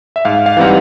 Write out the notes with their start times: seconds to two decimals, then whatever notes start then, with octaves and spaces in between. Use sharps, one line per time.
0.16 E5
0.25 G#2 F5
0.46 F5
0.57 E3 G3 C4 D#4 F#5